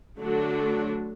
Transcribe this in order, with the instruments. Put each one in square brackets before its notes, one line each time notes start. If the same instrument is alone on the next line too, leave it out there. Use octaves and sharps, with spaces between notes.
[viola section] D3 F#3 A3 D4 F#4